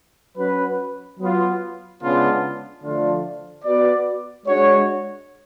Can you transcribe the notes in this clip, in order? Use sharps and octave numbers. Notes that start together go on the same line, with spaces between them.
F#3 C#4 F#4 B4
F#3 B3 F4
C#3 G#3 B3 D4 F4
D3 F3 A3 D4 F4
B3 F#4 B4 D5
G#3 D4 F#4 C#5